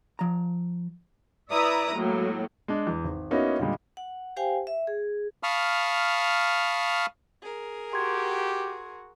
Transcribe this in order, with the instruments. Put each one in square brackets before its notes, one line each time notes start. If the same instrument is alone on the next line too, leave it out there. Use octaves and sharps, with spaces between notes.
[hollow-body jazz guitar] F3 A#5
[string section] E4 B4 D5 E5 A#5 D#6
A2 F#3 G#3 A#3
[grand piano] G#3 D4
E2
G#1
A#3 B3 C#4 D#4 E4 F#4
A#2 D3 G3 G#3
[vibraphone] F#5
G4 C5 F5 G5 G#5
E5
G#4
[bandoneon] F5 A5 B5 C#6 D#6 F6
[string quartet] G#4 A#4
[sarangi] F#4 [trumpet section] G4 [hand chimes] C6 G#6